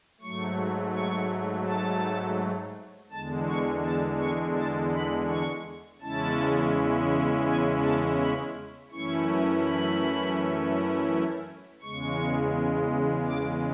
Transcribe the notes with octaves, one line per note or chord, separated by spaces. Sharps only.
G#2 F#3 A3 C#6
C#6
A5
E2 D3 G#3 A5
C#6
A5
C#6
A5
B5
C#6
E2 C#3 G#3 C#4 E4 A5
G#5
A5
B5
F#2 E3 A3 C#4 E4 C#6
B5
E2 C#3 G#3 C#6
D6